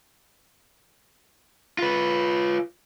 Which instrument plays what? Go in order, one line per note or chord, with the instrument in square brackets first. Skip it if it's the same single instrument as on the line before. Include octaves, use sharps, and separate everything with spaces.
[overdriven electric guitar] F4 B4